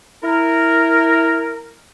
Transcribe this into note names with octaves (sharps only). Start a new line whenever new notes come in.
E4 A#4